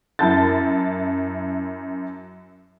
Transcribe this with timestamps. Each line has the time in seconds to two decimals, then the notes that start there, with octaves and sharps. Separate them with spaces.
0.19 F#2 E4 A5 G6 A6